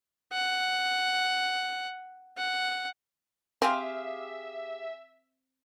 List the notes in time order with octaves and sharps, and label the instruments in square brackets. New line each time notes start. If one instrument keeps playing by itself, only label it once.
[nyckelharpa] F#5
F#5
[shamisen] C4 [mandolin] G4 G#4 F5 [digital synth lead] E5